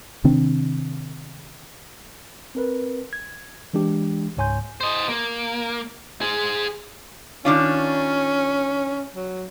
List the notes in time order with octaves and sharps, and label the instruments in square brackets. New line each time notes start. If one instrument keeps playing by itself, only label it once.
[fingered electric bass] C3 D#3 C4 D4
[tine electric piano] C4 A#4 B4
G#6
E3 G#3 D4 G4
C#2 G#2 C#5 G#5 C6 G6
[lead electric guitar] C5 D#5
A#3
G#4 C5
[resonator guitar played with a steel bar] D#3 D4 F4 [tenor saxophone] C#4
[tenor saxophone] F#3